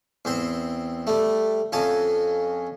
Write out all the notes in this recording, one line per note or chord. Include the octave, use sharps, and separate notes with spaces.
E2 C4 C5
G3 A3
F2 C#4 G#5 A5